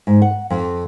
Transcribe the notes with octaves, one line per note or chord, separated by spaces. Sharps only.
G#2
F#5
F2